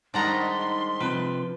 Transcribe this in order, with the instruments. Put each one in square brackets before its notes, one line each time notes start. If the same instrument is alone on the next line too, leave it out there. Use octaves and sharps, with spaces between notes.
[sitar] G#2 D#3 G3 [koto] D4 F#5 A#5 [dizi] C6
[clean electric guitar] C3 F3 [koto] B4